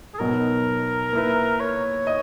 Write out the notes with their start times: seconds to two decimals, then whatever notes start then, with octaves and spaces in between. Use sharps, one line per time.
0.14 G#4
0.19 B2 F#3 B3 D#4 A#4
1.13 A#3 E4 B4
1.60 C#5
2.07 D#5